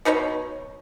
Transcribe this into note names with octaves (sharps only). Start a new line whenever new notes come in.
B2 D#4 B4 C#5